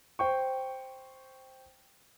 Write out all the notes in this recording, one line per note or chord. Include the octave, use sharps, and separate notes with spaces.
C5 G5 C#6